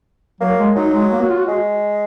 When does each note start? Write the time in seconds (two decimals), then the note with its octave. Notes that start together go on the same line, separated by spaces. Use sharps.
0.41 F#3 A#3
0.58 G#3
0.76 F#3 D#4
0.93 G#3
1.12 A#3
1.21 F#4
1.30 F4
1.38 F#4
1.48 G#3